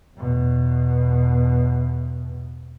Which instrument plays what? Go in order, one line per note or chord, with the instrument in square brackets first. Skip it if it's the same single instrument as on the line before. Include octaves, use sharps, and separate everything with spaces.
[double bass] E2 B2